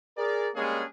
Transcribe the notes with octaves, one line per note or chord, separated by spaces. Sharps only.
G#4 A#4 D5
G3 G#3 A#3 C#4 D4 G#4